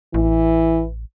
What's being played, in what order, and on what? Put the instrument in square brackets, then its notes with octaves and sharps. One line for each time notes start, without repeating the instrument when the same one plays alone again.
[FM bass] A1 [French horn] E3